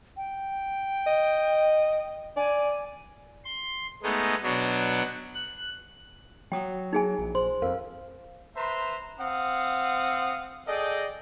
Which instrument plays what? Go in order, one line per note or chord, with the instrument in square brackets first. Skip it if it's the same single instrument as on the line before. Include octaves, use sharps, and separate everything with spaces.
[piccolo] G5
[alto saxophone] D#5
[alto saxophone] D5 [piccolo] G#5
[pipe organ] C6
G#3 A3 B3 D#4
B2 F#3 D4
F#6
[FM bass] F#3 [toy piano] G5 D#6
[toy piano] D#4 G#4 G#5
[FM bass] A#1
[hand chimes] C5 [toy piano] C6
[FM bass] F2 [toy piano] A#4 [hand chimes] F5
[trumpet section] B4 C5 E5 A#5 C6
C4 F5 F#5 D#6
G#4 A4 D5 D#5 G5